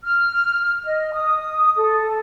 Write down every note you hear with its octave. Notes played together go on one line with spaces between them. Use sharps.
F6
D#5
D#6
A4